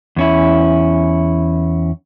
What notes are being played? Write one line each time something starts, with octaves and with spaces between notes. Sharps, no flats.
E2 C#4 E4